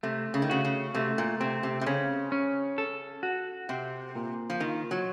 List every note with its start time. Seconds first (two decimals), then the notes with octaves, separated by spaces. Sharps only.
0.03 C3 A3
0.34 C#3
0.42 D#3
0.50 C#3 F#4
0.65 C#3
0.95 C3 A3
1.18 A#2
1.40 C3 C4
1.63 C3
1.81 C3
1.86 C#3 C#4
2.32 C#4
2.78 A4
3.23 F#4
3.69 C3 C4
4.15 A#2
4.50 F3
4.60 D#3 F4
4.91 F#3